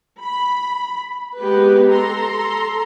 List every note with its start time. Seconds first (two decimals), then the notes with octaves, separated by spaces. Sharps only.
0.22 B5
1.37 G#3 B3 G4 B4
1.90 A4 A#5 C6